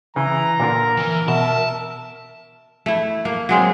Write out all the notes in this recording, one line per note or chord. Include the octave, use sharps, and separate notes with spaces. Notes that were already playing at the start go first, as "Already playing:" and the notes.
C#3 E3 A#5
A#2 D3 F4 A#4
E3
B2 E5 A5
A3 E4
A#3
F#3 G#3 C4